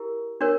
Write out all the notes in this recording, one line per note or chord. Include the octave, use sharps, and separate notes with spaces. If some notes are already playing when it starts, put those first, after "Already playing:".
Already playing: E4 G4 A#4
D4 F#4 A#4 C#5